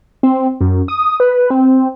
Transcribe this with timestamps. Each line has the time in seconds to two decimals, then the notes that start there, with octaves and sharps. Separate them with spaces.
0.23 C4
0.61 F#2
0.88 D#6
1.20 B4
1.50 C4